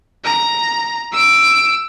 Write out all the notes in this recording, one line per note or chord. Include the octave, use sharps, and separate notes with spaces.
A#5
E6 D7